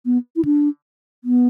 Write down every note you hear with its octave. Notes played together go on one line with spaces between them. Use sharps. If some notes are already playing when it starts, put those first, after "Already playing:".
B3
E4
D4
B3